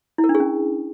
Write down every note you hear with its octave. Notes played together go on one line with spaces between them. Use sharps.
E4
A#4
D4
G#4
C#4